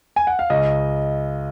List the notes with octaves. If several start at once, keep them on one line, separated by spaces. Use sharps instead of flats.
G#5
F#5
F5
C#2 D#5